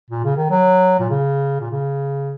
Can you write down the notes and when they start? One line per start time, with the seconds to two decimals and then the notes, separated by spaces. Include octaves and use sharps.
0.11 A#2
0.24 C#3
0.37 D#3
0.50 F#3
1.00 A#2
1.10 C#3
1.61 A#2
1.71 C#3